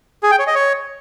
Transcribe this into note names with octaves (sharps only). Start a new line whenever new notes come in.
G#4
G5
C#5
D#5
C#5